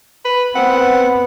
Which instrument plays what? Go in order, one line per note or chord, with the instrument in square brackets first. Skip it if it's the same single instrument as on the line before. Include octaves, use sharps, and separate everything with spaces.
[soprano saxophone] B4
[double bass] B3 [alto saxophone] C4 [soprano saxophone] F#5